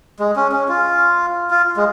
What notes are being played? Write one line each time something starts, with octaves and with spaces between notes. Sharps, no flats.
G#3
C#4
C#4
F4
F4
G#3